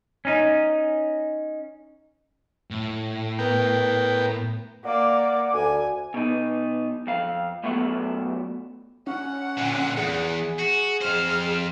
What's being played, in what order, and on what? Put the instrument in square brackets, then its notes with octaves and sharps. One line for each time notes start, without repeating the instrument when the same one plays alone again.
[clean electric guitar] C#4 D#4
[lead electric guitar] A2
[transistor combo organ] B3 A#4 G5
[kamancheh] A#3 D5 [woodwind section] F#5 D6
[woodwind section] D2 [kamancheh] G#5
[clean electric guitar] B2 D#4
F2 F5
F#2 A3 B3 F#4 A4 F#5
[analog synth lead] C#4 [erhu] F#5
[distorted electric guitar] A#2 D3
[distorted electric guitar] E2 [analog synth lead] G#4
[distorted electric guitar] F#4
[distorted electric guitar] F2 C5 [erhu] F6